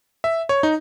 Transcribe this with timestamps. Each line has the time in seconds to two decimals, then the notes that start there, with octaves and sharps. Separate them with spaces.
0.24 E5
0.49 C#5
0.63 D#4